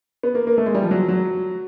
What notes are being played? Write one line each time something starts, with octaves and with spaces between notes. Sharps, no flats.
B3
A#3
A#3
A3
G#3
G3
F3
F#3
F#3